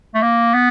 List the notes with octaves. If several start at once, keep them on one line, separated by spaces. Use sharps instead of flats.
A3
A#3
B3